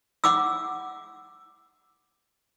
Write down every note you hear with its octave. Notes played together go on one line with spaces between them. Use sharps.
F#5 D6 E6